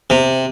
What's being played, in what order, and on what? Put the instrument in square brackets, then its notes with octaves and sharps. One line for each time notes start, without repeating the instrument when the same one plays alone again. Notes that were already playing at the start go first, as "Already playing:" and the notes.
[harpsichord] C3